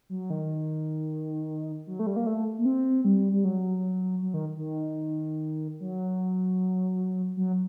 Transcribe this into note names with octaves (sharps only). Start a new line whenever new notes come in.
F#3
D#3
F#3
A3
G3
A#3
A3
A#3
C4
G3
G3
F#3
F#3
D#3
D#3
F#3
F#3